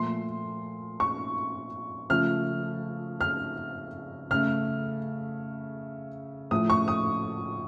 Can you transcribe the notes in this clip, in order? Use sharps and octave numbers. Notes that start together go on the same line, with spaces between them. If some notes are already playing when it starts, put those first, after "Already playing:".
Already playing: A#2 F3 A3 C6
C#6
C#3 F3 A3 F6
F6
C#3 A3 F6
A2 F3 A3 D#6
C#6
D#6